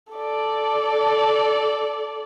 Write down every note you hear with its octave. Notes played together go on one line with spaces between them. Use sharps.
A4 D5